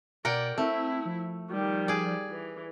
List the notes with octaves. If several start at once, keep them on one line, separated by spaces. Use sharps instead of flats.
B2 A#4 D5 F#5 G5
A3 C4 E4
F3
D#3 G3
G#4 D5
E3